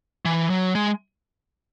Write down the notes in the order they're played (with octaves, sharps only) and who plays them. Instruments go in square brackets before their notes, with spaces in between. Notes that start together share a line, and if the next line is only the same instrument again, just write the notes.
[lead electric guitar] E3
F#3
G#3